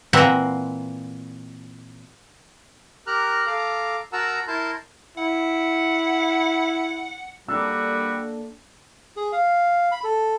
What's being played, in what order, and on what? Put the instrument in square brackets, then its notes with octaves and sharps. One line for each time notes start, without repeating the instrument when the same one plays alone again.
[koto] A#2 E3 C4 E5 F#5 A#5
[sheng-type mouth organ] G4 A#4 A#5 F6 F#6
A4 F5 A#5 D6
F#4 A#4 F#5 A5 A#5 E6
E4 A#4 A5 C6 G6
[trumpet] E4 [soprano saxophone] F#5
[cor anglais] G3 [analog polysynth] A#3 D4 A4 [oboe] F#4 [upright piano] E6
[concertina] G#4
F5
B5
A4